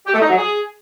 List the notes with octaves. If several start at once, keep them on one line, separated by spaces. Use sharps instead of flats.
G4
A3
D#4
F#3
G#4